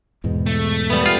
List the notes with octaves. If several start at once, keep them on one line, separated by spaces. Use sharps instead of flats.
E2 G#2 B2
A3
G3 B3
F4